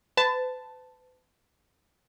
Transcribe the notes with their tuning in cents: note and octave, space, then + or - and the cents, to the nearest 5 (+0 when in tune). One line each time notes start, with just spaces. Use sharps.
B4 +40 A5 +0